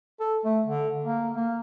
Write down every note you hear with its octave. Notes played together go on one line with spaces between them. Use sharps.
A4
A3
D3
A#3
A#3